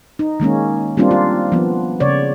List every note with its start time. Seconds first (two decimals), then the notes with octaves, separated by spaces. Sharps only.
0.19 D#4
0.40 D#3 G#3 A#3 C#4
0.97 G3 A#3 C4 D4 F4
1.11 F4
1.52 F3 B3
2.00 C#3 C#5 D5